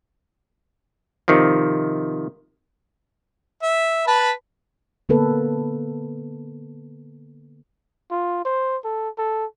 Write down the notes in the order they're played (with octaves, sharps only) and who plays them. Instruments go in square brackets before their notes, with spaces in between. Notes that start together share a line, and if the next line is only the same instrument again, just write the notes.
[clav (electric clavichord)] C3 D#3 F3
[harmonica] E5
B4 A5 B5
[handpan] D3 A#3 B3 A4 B4
[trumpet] F4
C5
A4
A4